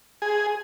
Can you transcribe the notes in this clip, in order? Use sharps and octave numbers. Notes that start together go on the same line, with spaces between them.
G#4